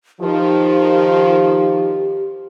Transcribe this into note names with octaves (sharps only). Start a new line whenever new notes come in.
D#3 F3 G4